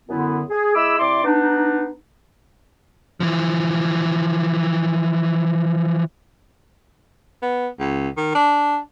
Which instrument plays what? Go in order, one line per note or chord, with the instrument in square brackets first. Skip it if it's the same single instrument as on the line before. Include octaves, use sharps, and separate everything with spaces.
[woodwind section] F#2 D3 B3 E4
G#4
G#3 E4 G#4 B5 D6 E6
C3 E4 D5 C6 D6
B3 D4 D#4
[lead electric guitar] E3 F3
[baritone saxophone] B3
C#2
D#3
D4